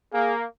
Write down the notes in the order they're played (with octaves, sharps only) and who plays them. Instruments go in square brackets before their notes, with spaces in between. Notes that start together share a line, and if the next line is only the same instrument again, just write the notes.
[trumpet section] A#3 [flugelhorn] G#4